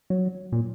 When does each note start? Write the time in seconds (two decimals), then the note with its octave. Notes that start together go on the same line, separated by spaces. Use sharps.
0.10 F#3
0.52 A#2